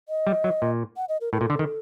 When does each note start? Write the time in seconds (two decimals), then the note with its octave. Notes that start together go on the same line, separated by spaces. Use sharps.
0.09 D#5
0.27 G3
0.44 F#3
0.62 A#2
0.97 F#5
1.09 D#5
1.21 A#4
1.33 A2 A#4
1.38 A#2 A4
1.50 D3
1.59 D#3